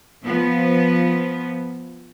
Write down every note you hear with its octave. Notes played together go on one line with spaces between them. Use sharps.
F3 B3